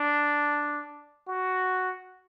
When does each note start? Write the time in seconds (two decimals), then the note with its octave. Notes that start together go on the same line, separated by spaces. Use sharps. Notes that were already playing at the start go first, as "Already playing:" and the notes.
Already playing: D4
1.27 F#4